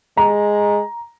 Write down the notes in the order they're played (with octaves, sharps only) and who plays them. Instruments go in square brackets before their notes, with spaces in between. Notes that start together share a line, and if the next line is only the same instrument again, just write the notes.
[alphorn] G#3 [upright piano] A#5